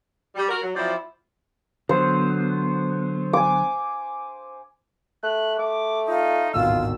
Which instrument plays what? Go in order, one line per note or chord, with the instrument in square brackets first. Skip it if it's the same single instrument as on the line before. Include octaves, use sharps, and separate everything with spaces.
[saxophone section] G3
F#4 A#4
F#3
F3 F#3 C4 E4 D5
[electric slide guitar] D3 F#3 B3 [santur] C5
[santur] G#5 D6
[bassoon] A3 [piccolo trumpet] F#6
[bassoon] A3 [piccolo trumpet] D6
[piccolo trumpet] D#4 [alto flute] F4
[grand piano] D1 G#1 B2 [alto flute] F4 [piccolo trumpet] E6